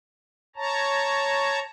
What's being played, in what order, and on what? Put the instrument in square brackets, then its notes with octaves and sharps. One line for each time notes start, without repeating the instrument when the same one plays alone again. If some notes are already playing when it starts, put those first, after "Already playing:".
[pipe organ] C#5 A5 A#5